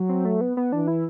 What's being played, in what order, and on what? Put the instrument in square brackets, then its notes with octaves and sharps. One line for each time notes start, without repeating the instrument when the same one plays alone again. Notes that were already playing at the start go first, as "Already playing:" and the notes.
Already playing: [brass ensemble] F#3
[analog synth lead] C4
A3
B3
B3
[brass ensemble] E3 [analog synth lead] D4
[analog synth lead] E4